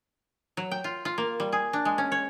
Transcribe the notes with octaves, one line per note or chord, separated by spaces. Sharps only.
F#3
G5
F4
F4
A#3
G3
G#4
D4
G#3
C#4
C#5